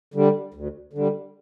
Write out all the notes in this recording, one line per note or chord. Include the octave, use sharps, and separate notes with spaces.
D3 G3
D2
D3 G3